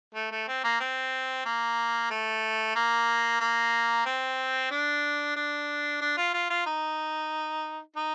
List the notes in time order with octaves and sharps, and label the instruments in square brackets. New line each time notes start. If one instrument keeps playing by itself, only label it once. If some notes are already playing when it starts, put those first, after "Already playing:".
[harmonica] A3
A3
C4
A#3
C4
A#3
A3
A#3
A#3
C4
D4
D4
D4
F4
F4
F4
D#4
D#4